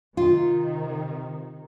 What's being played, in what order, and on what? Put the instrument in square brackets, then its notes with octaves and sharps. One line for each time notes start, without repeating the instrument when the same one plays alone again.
[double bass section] C3 D#3 [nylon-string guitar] F4